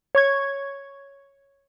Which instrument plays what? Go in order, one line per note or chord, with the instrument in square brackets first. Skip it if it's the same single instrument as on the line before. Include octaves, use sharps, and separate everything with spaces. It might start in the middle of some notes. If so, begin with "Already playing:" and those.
[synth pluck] C#5 C#6 G#6